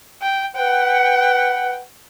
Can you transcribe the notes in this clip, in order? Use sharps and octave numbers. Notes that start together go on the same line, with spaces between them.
G5
B4 F#5 G5